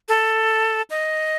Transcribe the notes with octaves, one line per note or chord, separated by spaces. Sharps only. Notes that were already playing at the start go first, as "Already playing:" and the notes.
A4
D#5